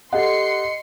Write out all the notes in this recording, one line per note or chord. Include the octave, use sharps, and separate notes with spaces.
G4 A4 D#5 F#5 C6 C7 C#7